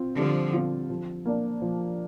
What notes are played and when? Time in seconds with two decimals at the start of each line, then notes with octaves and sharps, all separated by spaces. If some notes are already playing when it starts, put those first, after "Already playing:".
Already playing: C4 F4
0.17 D3 F3 G3
0.53 C4 F4
0.90 F3
1.26 A#3 D4
1.62 F3